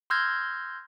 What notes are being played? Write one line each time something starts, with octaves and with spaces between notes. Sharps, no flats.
C6 E6 F6 G6 G#6 A#6